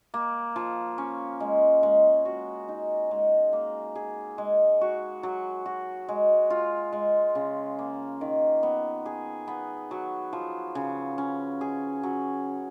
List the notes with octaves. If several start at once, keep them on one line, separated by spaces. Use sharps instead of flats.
A#3
F3
C#4
G#3
G#3
F#4
D#4
G#3
A#3
G#4
G#3
F#4
F#3
F#4
G#3
F4
G#3
C#3
A#3
D#3
B3
G#4
B3
F#3
F3
C#3
C#4
G#4
F#3